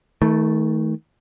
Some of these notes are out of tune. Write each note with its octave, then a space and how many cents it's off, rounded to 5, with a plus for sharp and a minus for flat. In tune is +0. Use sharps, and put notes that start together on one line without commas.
D#3 +40 A3 -5